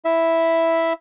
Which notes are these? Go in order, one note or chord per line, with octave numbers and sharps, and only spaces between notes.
E4 E5